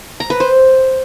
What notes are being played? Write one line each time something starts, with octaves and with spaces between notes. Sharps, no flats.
A#5
B4
C5